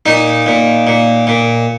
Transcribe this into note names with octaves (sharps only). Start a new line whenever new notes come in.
A#2 D#4
A#2
A#2
A#2